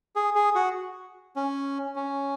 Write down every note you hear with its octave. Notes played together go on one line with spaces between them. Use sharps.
G#4
G#4
F#4
C#4
C#4